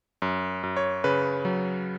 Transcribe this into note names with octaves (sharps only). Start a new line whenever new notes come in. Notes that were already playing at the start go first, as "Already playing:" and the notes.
F#2
F#2
C#5
C#3 B4
F#3